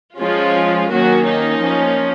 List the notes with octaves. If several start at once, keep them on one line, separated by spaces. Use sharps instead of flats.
F3 G#3 C#4 F4
D#3 F#3 A#3 C#4 F#4
D#4
F3 A#3 C#4